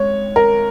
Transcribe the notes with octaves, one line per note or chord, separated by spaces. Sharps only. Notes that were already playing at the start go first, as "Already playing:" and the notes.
Already playing: G#3 C#5
A#4